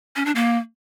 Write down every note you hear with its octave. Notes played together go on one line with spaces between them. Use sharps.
C#4
D4
A#3